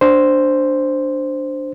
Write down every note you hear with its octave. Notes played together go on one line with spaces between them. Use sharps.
D4 C5